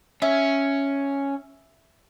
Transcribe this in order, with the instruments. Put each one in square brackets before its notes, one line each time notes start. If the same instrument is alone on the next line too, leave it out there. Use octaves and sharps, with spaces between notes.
[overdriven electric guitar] C#4 [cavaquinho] E5